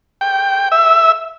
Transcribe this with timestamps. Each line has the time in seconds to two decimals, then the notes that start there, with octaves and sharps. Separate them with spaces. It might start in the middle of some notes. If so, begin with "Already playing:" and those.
0.21 G5
0.72 E5